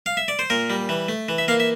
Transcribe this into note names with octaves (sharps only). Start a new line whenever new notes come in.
F5
E5
D5
C5
A#2 A#4
G3
E3
A3
E3
E5
A#3 F5
E5